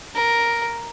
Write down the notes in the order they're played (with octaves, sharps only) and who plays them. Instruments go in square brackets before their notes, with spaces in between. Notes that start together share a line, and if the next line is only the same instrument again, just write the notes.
[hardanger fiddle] A#4